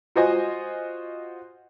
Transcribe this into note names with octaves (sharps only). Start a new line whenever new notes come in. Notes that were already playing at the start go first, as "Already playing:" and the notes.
F4 F#4 C5 D#5 G#5